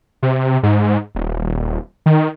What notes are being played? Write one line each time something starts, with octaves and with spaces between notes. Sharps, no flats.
C3
G#2
D#1
D#3